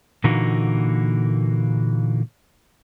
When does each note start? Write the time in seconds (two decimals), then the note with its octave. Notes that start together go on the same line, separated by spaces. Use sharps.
0.24 A#2 D3 E3 A#3 D#4 F#4